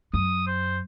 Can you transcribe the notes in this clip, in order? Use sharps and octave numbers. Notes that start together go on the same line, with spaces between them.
F#2 D#6
C5